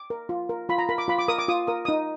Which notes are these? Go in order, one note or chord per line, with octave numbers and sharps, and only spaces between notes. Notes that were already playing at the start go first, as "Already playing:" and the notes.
Already playing: D6
A#4
F4
A#4
F4 B5
A#5
A#4 B5
D6
F4 B5
D6
A#4 D#6
D6
F4 D#6
A#4 D#6
D#4 D#6